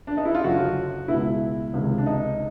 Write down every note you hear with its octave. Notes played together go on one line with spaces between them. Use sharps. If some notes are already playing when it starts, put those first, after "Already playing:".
D4
D#4
E4
F4
F#1 F#2 D3 F#4
C#2 B2 E4
C#2 C3 D#3
D4
D#4